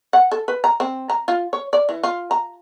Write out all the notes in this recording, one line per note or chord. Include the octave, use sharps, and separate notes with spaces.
F#5
A4
B4
A#5
C4
A#5
F4
C#5
D5
E3
F4
A#5